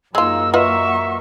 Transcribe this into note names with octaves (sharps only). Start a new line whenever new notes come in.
F#2 G#3 A#3 D#4 F4 E6
F4 B4 D#5 E5 F#5 C#6